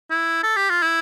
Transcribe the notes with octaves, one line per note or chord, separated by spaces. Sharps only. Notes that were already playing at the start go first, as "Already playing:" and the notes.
E4
A4
G4
F4
E4